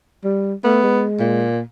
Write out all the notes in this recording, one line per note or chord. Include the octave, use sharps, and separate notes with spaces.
G3
A3 B3
G#3
A#2